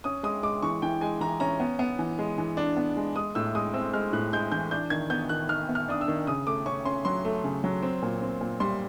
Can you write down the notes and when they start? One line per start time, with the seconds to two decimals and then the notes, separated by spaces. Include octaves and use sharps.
0.04 C#4 D#6
0.23 G#3 D#6
0.43 G#3 D6
0.62 E3 C#6
0.82 E3 G5
1.01 G#3 G#5
1.21 E3 A#5
1.40 C#4 A#5
1.60 B3
1.79 B3
1.99 E3
2.19 G#3
2.38 E3
2.57 D4
2.77 B3
2.97 G#3
3.16 G#3 D#6
3.35 A2 E6
3.55 G#3 D#6
3.74 C4 E6
3.93 G#3 F6
4.13 A2 F#6
4.33 G#3 G6
4.52 E3 G6
4.71 D4 G6
4.90 D#3 G#6
5.10 B3 G6
5.29 D#3 F#6
5.49 D#3 F6
5.69 B3
5.75 F6
5.89 D4 D#6
6.01 E6
6.08 D#3
6.27 C#3 D#6
6.47 A3 D6
6.66 C#4 C#6
6.85 C#4 C6
7.05 F#3 C6
7.25 A3
7.44 C#3
7.64 F#3
7.83 C4
8.02 A#2
8.22 C4
8.41 A#2
8.60 G3 C6